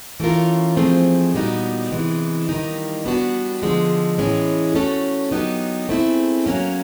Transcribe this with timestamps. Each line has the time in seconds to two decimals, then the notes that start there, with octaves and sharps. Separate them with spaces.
0.20 E3 A3 C#4 F4 A#4
0.77 F3 A3 C4 D#4 G#4
1.34 A#2 G3 B3 D#4 F#4
1.90 C3 E3 G#3
2.48 D#3 G3 A#3 D#4
3.05 G3 B3 D4 F#4
3.62 D3 F3 G#3
4.18 A2 E3 G#3 C#4
4.75 A3 C#4 F#4 A4
5.31 F#3 B3 D#4 G4
5.89 A3 C4 E4 G#4
6.46 F#3 A#3 C#4